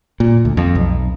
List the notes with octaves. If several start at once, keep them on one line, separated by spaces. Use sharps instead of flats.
A#2
D2
F2
B1